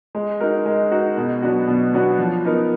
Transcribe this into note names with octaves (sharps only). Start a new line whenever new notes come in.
G#3
D#4 F#4 A#4
G#3
D#4 F#4 A#4
B2
F#3 B3 D4 F#4
B2
F#3 B3 D4 F#4
F3
B3 D#4 A#4